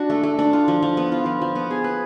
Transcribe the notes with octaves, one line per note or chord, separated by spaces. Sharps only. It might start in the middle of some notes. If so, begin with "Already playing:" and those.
Already playing: D4 F#4
A3
A3
D4
F4
F3
F3
B3
F4
F3
F3
B3
G#4
B4